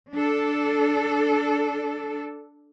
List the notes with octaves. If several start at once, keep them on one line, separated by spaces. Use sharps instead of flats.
D4 A4